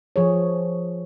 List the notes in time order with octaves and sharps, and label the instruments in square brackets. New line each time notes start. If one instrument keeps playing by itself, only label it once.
[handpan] F3 G#4 C#5